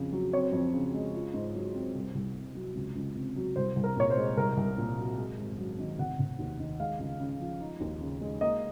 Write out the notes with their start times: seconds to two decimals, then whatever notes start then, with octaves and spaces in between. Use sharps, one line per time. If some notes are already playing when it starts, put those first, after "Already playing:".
Already playing: F2 C#3 C4
0.12 F#3
0.33 C4 C#5
0.53 F2
0.73 C#3
0.94 G#3
1.14 F4
1.34 G#2
1.54 F#3
1.74 C4
1.95 C2
2.15 C2
2.35 C3
2.55 F#3
2.75 C#2
2.95 C#2
3.16 C3
3.36 F#3
3.56 C2 C5
3.76 C2
3.84 A#4
3.96 A#2 C#5
4.10 C5
4.17 G#3
4.37 C2 A#4
4.57 C2
4.78 A#2
4.97 F#3
5.18 G#3
5.38 G#1
5.58 F#2
5.79 D#3
5.99 F1 F#5
6.19 F1
6.39 D#2
6.60 D#3
6.80 G#3 F5
6.99 C#2
7.20 C#3
7.40 F3
7.60 D#4
7.80 D#2
8.01 C#3
8.21 G#3
8.41 A#3 D#5